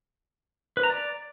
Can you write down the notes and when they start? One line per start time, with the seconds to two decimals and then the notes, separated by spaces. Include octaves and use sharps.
0.77 B4
0.83 A#5
0.90 D5